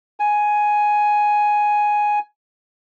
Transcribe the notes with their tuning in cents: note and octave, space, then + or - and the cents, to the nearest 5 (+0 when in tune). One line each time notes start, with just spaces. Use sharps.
G#5 +5